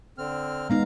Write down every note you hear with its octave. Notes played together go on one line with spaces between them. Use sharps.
D3 C4 F6
G#3 B3 D#4 F5 A#5